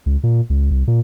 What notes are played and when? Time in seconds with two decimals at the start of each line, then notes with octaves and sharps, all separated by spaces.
0.06 C#2
0.24 A#2
0.50 C#2
0.71 C2
0.88 A#2